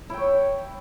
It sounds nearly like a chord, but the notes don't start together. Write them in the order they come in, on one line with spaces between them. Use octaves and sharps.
E4 G5 C#5